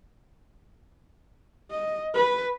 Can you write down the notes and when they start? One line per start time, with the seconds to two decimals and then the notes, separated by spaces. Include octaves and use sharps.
1.71 D#5
2.14 B4